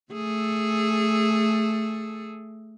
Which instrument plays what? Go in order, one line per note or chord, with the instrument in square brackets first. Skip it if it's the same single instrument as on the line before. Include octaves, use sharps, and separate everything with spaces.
[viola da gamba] A3 G#4 A4